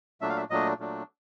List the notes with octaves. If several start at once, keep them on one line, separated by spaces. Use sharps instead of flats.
A#2 F#3 A3 D4 E5
F5
E5
A#2 F#3 A3 D4 D#5
A#2 F#3 A3 D4